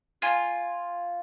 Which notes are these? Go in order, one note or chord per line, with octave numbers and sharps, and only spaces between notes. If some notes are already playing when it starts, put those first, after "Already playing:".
F4 G#5